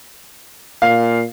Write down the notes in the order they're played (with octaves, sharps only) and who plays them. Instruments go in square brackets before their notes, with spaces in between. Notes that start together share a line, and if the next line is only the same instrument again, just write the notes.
[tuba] A#2 [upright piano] F5